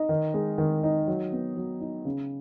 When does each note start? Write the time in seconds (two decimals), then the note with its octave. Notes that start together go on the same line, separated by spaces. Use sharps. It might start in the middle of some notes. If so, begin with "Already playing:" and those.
Already playing: D#4
0.09 D#3
0.34 G#3
0.58 D#3
0.84 D#4
1.08 F#3
1.32 B3
1.57 F#3
1.81 D#4
2.05 C#3